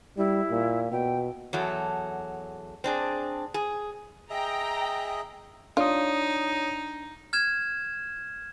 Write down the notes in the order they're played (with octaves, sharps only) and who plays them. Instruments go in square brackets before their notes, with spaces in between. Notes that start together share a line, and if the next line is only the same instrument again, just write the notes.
[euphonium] G3 [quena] E4
[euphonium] A#2
[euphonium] B2 [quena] G5
[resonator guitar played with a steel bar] E2 F#3 A4
C4 D4 G#4
G#4
[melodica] G#4 D#5 E5 [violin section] G5 A#5
[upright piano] D4 [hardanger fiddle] D#4 [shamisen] F4 [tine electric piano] C#5 D#6
[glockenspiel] F6 G#6 E7